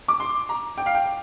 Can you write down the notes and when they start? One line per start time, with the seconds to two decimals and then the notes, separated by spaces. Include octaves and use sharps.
0.08 D6
0.20 C6
0.49 A#5
0.78 G5
0.86 F5
0.95 G5